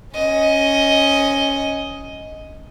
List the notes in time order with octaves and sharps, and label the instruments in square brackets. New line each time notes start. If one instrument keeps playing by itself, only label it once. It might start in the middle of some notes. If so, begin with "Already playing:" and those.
[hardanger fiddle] C#4 D#5